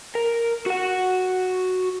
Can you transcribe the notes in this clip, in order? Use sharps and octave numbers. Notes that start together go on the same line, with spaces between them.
A#4
F#4 F#5